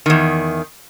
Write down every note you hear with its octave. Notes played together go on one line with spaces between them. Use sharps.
E2 D#3